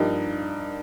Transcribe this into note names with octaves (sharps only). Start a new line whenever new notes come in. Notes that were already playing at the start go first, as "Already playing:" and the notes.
Already playing: G2 F3 A#3 D#4 G4